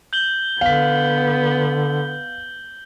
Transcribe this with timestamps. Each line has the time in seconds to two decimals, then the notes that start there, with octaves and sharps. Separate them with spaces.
0.13 G6 F#7 G7
0.61 D3 B3 F5 B6